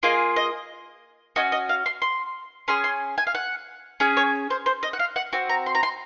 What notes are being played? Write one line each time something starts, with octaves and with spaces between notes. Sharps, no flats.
A#3 F4 G#4 D#5
D#5
C#4 F#4 D#5
D#5
F5
C6
C6
C#4 G#4 C6
C6
G#5
F5
F#5
C#4 G#4
C#5
C5
C5
D#5
F#5
F5
F#5
C4 F#4
A#5
C6
A#5
C6